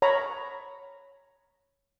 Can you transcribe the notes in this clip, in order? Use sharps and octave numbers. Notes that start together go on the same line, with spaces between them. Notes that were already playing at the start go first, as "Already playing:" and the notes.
C#5 A#5 B5